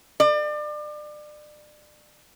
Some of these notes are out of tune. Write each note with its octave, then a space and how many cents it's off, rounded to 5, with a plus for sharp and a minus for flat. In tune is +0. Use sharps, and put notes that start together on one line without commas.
D5 +30